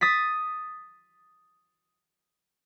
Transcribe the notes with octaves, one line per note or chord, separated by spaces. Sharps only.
D#6 A6 B6